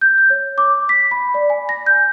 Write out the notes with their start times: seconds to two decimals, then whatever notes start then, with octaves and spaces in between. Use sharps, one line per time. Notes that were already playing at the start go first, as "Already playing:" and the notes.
0.01 G6
0.18 G6
0.30 C#5
0.58 D6
0.89 B6
1.11 B5
1.34 D5
1.50 G#5
1.69 A#6
1.86 G6